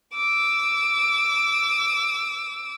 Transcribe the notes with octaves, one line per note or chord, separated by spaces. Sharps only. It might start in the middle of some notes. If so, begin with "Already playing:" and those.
D6 E6